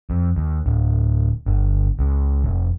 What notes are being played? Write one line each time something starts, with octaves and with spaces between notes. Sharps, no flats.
F2
D#2
D1
G1
C#2
F1